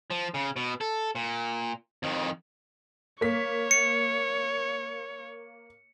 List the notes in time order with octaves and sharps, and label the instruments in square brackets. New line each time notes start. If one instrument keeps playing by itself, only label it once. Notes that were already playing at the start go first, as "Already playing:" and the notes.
[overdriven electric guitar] F3
C#3
B2
A4
A#2
F2 D#3
[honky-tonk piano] A#3 B6 [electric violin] C#5
[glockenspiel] C#7